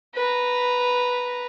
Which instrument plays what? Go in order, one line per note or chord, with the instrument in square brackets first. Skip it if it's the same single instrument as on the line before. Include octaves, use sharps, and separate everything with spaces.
[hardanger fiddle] B4 A#5